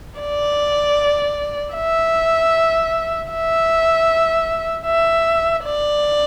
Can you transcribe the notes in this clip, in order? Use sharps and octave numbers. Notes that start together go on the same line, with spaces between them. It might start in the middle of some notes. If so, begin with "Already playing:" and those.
D5
E5
E5
E5
D5